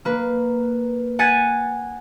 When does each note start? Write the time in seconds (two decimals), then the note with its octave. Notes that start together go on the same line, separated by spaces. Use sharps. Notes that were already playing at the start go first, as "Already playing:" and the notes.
0.05 A#3 B4
1.19 F#5 G#5 G#6 A6 B6 D#7